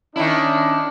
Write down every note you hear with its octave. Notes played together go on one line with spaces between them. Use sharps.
D#3 C#4 D4 E4